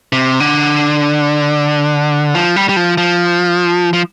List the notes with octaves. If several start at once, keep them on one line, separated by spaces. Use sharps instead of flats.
C3
D3
F3
G3
G3
F3
F3
F3